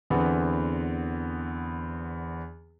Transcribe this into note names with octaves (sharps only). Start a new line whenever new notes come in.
E2 D3 E3 B3 C4